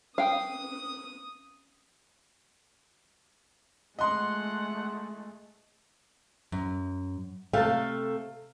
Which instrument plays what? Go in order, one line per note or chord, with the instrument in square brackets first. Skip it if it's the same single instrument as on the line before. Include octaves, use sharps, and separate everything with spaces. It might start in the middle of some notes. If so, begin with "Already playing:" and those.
[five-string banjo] F5 G5 [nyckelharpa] D#6
[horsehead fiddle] G#3 A3 [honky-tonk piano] D#5 C6 [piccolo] F#5
[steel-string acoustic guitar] F#2
[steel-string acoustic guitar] C3 A3 [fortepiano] A4 F5